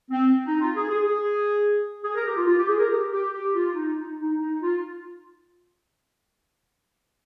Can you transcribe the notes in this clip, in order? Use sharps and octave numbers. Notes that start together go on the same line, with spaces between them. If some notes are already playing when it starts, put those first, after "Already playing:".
C4
D#4
F4
G#4
G#4
G#4
G#4
A#4
G4
F4
F4
G4
G#4
A#4
G4
G4
G4
F4
D#4
D#4
D#4
D#4
F4